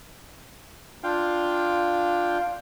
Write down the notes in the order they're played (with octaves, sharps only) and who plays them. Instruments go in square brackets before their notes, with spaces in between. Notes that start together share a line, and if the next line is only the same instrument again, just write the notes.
[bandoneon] D4 F4 F5 G5